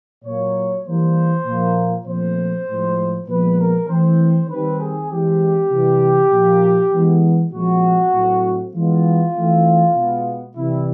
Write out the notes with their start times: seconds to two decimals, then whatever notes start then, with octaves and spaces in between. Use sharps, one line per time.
0.25 A#2 F#3 A#3 C#5
0.84 E3 G3 A#3 C5
1.46 A#2 F3 A#3
2.06 A#2 F3 A3 C4 C5
2.67 A2 F3 G#3
3.28 A#2 F3 G#3 B3 B4
3.59 A#4
3.89 E3 A3 C4 C5
4.49 D#3 G3 C4 B4
4.79 G#4
5.09 E3 G#3 C4 G4
5.71 C3 E3 G3
6.32 A#2 F3 A#3
6.93 E3 G#3 B3
7.52 A#2 F3 G#3 C4 F#4
8.14 A2 F#3 A3 C4
8.74 E3 G#3 B3 F4
9.35 E3 A3 C4
9.95 B2 G#3 B3
10.56 C3 E3 G3 E4